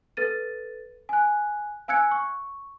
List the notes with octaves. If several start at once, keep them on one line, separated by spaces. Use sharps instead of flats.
A4 B4 A6 D#7
G#5 F#6
F5 G#5 E6 F#6 G#6 C#7
C#6